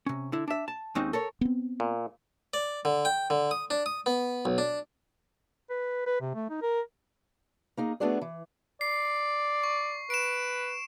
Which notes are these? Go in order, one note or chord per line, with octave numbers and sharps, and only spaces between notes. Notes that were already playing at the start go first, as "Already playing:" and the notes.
C3 C#4
D3 E4
D4 E5
A5
D#2 G#3 C4 C#4 D#4
A4 A#4 C#5
B3 C4
A#2
D5
D3
G5
D3
D#6
D4
D#6
B3
B1
D4
B4
B4
C3
A3
D#4
A#4
A#3 D#4 G#4
A3 B3 D4 F#4 G#4 D5
E3
D5 C7
C#6
B4 D7 E7